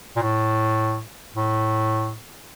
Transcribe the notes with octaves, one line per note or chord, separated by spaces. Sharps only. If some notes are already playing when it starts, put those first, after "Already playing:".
A#2
A2
A2